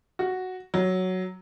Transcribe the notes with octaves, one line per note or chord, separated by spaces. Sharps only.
F#4
F#3